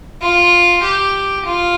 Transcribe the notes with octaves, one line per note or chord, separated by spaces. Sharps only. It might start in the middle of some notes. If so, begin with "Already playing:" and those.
F4
G4
F4